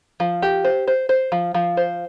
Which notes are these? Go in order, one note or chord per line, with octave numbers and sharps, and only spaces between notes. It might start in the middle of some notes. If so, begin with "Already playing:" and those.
F3
G4
C5
C5
C5
F3
F3
C5